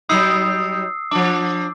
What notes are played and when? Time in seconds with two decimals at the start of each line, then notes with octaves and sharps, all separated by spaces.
0.09 F#3 G3 D#4 D#6 E6 C7
1.11 F3 D4 D6